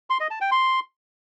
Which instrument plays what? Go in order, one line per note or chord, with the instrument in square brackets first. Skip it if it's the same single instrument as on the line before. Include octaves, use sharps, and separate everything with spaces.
[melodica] C6
D#5
A5
G5
C6